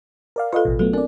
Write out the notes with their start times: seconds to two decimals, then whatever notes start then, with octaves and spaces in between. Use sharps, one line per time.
0.36 A#4 D5 F5
0.53 F4 A4 B4 D#5 F5
0.65 A1 B2
0.79 F#3 A3 B3 A4
0.93 C4 D4 A#4 D5